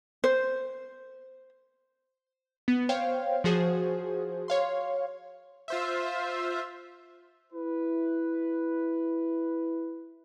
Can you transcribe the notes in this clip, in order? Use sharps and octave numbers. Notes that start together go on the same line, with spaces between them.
C5
B3
C5 C#5 F5 G5
F3 F#4 G#4 C5
C#5 F5 C6
F4 C5 E5
E4 B4